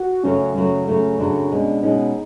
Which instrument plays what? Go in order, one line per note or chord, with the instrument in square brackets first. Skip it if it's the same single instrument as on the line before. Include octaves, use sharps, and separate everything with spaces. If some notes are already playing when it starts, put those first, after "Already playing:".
Already playing: [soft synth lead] F#4
[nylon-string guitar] F#2 C#3 F#3 A3 [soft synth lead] C#4
[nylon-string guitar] F#2 C#3 F#3 A3
F#2 C#3 F#3 A3
[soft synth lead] C#4
[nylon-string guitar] F#2 C#3 F#3 A3 [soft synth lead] D4
[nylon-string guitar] B2 G#3 C#4
[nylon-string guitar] B2 G#3 C#4 [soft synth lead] D#4